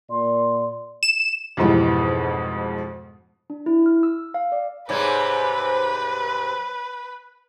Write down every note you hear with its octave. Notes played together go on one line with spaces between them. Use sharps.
A#2 A#3 D5 C6
E7
F2 G#2 B2 E3 G3
D4
E4
F6
E6
F5
D5
G#2 C3 G3 B4 C#5 G#6